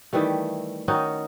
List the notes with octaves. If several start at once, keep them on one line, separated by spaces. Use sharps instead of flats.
D#3 E3 G3 A3
D#3 C#4 D#4 F#4